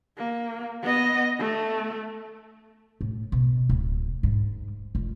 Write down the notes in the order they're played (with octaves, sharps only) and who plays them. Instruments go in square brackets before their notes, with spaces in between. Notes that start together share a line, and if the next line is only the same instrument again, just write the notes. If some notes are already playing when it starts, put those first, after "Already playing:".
[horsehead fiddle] A#3
B3 D#5
A3
[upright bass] A2
B2
D1
G#2
F1